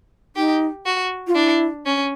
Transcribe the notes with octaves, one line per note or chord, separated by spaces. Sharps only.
D#4 G4
F#4
F4
D4 E4
C#4